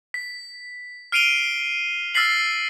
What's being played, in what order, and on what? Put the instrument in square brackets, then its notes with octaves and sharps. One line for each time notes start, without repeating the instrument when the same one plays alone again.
[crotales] B6
F6 C7 D7 D#7 F7 G7
E6 F6 A6 B6 C7 F#7